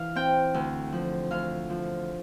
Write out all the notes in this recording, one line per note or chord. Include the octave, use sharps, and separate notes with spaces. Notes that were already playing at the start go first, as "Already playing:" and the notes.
Already playing: E3 F5
C4 G5
D2
F3
D2 F5
F3